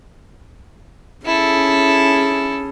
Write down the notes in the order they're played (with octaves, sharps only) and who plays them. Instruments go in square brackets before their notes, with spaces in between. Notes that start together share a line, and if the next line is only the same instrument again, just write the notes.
[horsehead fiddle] C#4 G#4 [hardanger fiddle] E4 A4